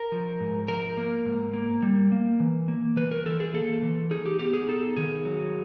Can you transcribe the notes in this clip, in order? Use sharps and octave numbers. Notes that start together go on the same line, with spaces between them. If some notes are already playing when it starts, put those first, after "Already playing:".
Already playing: A#4
F3
G#2
F3 A#4
A#3
G#2
A#3
G3
A#3
E3
A#3
E3 B4
A#4
E3 A4
G#4
A#3 A4
E3
D#4 G#4
G4
B3 G4
G#4
D#4 A4
D#3 G#4
F#3